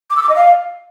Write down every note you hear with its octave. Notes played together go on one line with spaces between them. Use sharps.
D6
E6
D6
D#5
F5